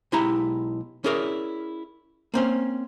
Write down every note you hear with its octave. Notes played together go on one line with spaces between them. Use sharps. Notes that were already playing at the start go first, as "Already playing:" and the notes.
B1 G#3 E4 G4 A#5
C#4 E4 G#4 A#4 D5
A#3 C4 C#4